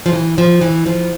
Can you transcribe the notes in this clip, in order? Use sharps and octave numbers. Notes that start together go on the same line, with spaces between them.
F3
E3
F3
E3
F3